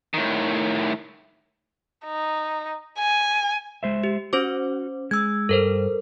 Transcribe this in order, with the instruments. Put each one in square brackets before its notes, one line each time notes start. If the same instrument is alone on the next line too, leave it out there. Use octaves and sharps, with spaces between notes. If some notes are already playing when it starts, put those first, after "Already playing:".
[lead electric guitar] A2 D#3
[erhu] D#4
G#5
[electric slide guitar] G#3 C5 E5
[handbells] G4
[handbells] C#4 C5 D6 [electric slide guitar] F#4
[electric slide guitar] G#3 [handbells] E6 G#6
[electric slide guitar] G2 [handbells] A4 A#4 C5